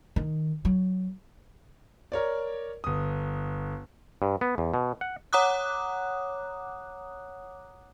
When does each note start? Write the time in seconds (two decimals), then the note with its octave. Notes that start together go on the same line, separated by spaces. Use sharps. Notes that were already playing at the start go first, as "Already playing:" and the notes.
0.16 D#3
0.65 F#3
2.12 A#4 C#5 D5
2.84 G1 D#6
4.22 G2
4.41 B3
4.58 E2
4.74 B2
5.01 F#5
5.33 C#5 F#5 A#5 D6 D#6 F#6